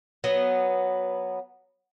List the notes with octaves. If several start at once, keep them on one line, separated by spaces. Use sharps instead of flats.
F#3 B3